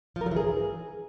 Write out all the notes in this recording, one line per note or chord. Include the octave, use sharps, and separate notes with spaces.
F3
A#4
F#3
E3
G#4